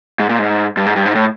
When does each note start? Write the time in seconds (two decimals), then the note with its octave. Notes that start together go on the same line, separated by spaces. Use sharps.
0.20 G#2
0.29 A#2
0.39 G#2
0.77 G2
0.86 G#2
0.96 G2
1.06 G#2
1.15 A2